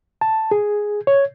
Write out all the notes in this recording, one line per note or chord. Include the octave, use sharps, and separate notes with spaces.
A5
G#4
C#5